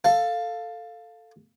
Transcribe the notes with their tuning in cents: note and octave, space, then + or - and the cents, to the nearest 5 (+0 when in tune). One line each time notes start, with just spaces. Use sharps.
A4 +10 F5 +5